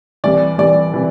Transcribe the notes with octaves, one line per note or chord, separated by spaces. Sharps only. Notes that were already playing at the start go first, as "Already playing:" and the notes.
C2 C3 E3 D5
C2 C3 E3 D5
C3 E3